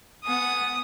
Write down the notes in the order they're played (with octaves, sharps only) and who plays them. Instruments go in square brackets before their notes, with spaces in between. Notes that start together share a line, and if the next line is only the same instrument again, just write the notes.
[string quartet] B3 F#5 G#5 [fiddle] D#6